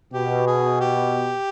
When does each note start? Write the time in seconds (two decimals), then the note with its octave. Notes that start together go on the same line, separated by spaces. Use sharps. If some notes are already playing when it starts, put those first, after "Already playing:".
0.13 B2 G4
0.47 G#4
0.81 G4